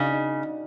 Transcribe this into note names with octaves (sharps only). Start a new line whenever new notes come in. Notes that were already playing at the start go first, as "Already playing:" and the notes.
Already playing: C#3 D4 D#4 F#4
D#4